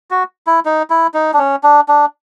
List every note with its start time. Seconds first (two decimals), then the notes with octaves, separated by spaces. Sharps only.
0.11 F#4
0.47 E4
0.65 D#4
0.90 E4
1.14 D#4
1.34 D4
1.39 C#4
1.63 D4
1.88 D4